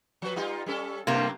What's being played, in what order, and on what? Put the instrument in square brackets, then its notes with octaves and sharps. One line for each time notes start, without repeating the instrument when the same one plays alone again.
[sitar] F3 B4
G3 D#4 F4
G3 C#4 A4
[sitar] F#2 A2 A3 [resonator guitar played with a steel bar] C3 A#3